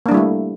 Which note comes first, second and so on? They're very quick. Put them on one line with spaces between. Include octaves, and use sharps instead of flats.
A#3 D4 G3 E4 A3